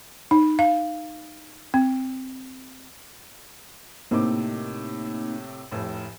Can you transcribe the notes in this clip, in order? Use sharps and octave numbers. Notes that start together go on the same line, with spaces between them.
D#4
F5
C4
A2 C3 A#3 C4 D#4 D6
F1 A2